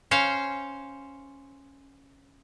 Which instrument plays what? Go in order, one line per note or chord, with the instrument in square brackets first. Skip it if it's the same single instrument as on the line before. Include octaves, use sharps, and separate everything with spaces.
[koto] C#4 C5 F5